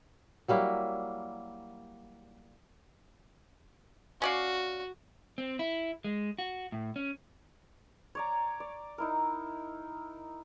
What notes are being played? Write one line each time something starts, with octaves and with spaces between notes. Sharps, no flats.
F#3 G3 A#3 E4
C#4 F#4 D5 F5
C4
E4
G#3
F#4
A2
C#4
C#5 D5 A#5
D5
D#4 E4 A#4